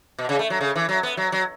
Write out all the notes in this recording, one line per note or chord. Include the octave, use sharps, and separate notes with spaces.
B2
C#3
A3
F#3
C#3
E3
F#3
B3
F#3
F#3